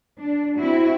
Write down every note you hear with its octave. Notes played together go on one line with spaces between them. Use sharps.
D4
C4 E4 F#4